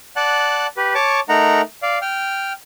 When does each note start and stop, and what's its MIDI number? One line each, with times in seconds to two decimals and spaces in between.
0.16 0.67 74
0.16 0.67 78
0.16 0.67 81
0.16 0.67 90
0.77 0.94 67
0.77 0.94 71
0.95 1.20 73
0.95 1.20 81
0.95 1.20 85
0.95 1.20 86
1.29 1.61 57
1.29 1.61 63
1.29 1.61 70
1.29 1.61 78
1.29 1.61 82
1.83 1.98 74
1.83 1.98 77
2.02 2.53 79
2.02 2.53 89